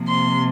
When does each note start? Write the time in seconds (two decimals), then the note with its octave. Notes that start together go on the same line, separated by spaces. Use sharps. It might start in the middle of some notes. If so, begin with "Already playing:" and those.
Already playing: C3 F3 A#3
0.09 C6